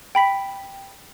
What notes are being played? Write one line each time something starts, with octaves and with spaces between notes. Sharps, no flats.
G5 B5 B6